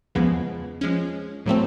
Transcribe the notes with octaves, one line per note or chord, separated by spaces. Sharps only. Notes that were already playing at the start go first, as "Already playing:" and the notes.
E2 C#3 F3 G#3 B3
F3 G#3 C#4
A2 F#3 A3 C4